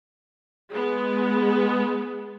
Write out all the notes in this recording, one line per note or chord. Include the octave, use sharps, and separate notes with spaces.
G#3 B3